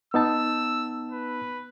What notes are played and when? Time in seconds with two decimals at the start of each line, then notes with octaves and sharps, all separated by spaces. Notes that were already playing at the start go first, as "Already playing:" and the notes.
0.14 B3 D#4 A5 E6
1.12 B4